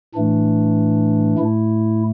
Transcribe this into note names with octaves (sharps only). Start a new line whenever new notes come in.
A2 E3 A3 D4
A2 A3 E4